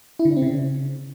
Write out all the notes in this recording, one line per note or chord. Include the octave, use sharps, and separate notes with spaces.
E4
D3
D4
C4
C#3